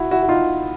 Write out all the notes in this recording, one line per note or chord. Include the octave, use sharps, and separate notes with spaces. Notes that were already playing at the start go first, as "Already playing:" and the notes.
Already playing: E4 F#4
E4 F#4
F#4
D#4 F4